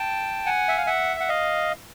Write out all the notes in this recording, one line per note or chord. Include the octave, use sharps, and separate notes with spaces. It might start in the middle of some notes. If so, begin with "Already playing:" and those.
Already playing: G5 A5
F#5 G#5
E5
F5
E5 F#5
F#5
D#5 F5